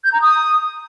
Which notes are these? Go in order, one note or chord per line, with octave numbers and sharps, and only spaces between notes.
G6
A#5
D#6